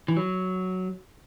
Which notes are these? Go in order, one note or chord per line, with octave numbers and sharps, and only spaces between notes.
E3
F#3